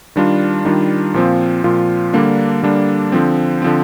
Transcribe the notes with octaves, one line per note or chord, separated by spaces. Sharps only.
D#3 G3 D4 F4
D#3 G3 D4 F4
A#2 F3 C4 F4
A#2 F3 C4 F4
D3 G3 A#3 D4
D3 G3 A#3 D4
D3 F3 C4
D3 F3 C4